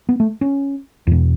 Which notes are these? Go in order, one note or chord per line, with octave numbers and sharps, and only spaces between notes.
B3
A3
C#4
E2 B2